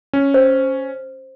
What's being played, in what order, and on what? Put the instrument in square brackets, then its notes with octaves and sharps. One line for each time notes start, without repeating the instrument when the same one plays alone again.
[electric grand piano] C#4
[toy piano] C5